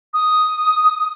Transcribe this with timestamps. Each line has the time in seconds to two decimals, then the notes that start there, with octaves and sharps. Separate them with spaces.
0.14 D#6